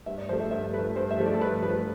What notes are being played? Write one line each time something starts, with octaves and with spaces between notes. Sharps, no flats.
G2 E5
D5
F3 A3 C5
E5
G2 E5
F3 A3 B4
G2 C5
E5
F3 A3
D5
A4
G2 B4
F3 A3 B4